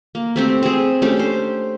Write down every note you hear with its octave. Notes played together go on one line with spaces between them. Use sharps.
A#3
A3 C4 G4
C4 G#4
A3 C#4 D4 G4
C5